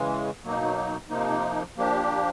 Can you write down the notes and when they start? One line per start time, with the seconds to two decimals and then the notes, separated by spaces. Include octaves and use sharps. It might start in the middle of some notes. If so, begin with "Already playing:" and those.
Already playing: C#3 E3 G#3
0.44 B2 F#3 A#3 D#4
1.10 C3 F3 A#3 D#4
1.77 F3 A#3 D4 G4